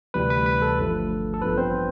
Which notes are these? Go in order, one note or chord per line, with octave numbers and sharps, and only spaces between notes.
D2 C3 E3 G3 B4
B4
B4
A4
G1 G2 D3 F3 A3
A4
A1 G2 F3 B3 B4
C4 C5